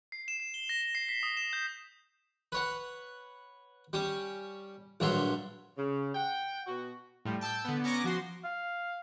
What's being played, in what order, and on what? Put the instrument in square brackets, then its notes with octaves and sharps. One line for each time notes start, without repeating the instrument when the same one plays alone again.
[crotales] C7
E7
C7
G7
A#6
A#6
C7
B6
D#6
E7
G6
[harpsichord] B4 C#5 F#5
G3 C#4
A#1 G2 F#3 C#5 E5 C6
[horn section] C#3
F#5 G5
B2 B3 F#4
[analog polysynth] A2 F3 G3
G5 A5 E6 G6
D3 B3
B3 C#4 A#5 C#6 D6 A#6
F3 F#4 C6
[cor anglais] F5